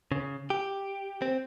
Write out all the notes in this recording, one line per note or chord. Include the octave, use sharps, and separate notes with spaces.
C#3
G4
C4